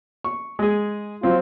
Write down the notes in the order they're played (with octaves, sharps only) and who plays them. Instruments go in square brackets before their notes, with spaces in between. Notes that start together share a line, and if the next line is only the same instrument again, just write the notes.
[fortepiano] C#6
G#3 G#4
[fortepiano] F#3 C4 [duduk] F4